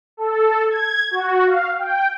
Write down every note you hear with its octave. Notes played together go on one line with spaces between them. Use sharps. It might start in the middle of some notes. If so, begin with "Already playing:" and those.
A4
G#6
F#4
F5
G5